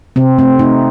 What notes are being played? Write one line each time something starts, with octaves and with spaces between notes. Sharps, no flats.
C3 C4
A3 C4
A3 D#4